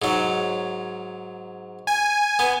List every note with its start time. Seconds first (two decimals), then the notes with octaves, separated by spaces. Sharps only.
0.02 G#2 F#3
1.87 G#5
2.39 B3